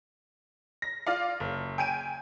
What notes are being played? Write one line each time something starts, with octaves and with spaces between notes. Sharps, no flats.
A#6
F4 D5 F5
F#1
G5 G#5 D7 D#7